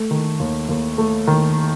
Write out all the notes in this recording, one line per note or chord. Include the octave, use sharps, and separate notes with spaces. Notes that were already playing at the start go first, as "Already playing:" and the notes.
Already playing: A3
D#3
D#2
D#2
A3
D#3